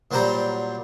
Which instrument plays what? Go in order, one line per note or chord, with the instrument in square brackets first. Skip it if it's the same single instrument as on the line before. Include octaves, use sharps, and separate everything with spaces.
[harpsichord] A#2 F#3 G3 C5 G5 A#5